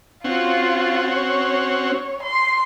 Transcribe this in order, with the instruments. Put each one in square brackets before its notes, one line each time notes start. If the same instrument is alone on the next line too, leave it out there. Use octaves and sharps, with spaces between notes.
[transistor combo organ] C4 C#4 F#4 [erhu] F4
[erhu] C#5
C6